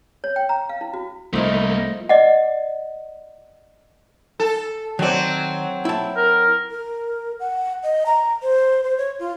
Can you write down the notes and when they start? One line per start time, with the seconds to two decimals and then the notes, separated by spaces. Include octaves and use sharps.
0.24 C#5
0.36 G5
0.49 A#5
0.69 F5
0.81 E4
0.94 F#4
1.33 C2 F3 A3 A#3 D#4 E4
2.09 D5 D#5 F#5
4.40 A4
4.99 D#3 F#3 C4 D5
5.85 E4 A5
6.17 A#4
6.71 A#4
7.40 F#5
7.83 D#5
8.06 A#5
8.42 C5
8.83 C5
8.98 C#5
9.19 F4